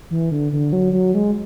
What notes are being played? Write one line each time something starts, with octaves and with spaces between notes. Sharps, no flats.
E3
D3
D3
F#3
F#3
G#3